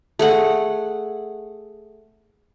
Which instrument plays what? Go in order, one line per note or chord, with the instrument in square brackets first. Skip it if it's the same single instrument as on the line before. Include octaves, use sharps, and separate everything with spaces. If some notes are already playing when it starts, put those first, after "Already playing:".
[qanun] A3 G#4 F#5